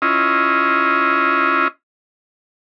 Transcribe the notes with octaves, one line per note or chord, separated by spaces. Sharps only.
C#4 E4 F4 D#5